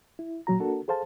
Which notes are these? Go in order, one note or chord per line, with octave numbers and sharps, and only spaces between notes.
E4
A#2 F#3 F#4 A#5
A#3 D4 F#4 A4 A#4
G#4 A4 C5 F5 A5